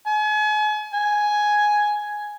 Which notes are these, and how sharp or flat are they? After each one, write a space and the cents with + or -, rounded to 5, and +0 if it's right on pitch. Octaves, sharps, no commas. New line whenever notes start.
G#5 +40
G#5 +5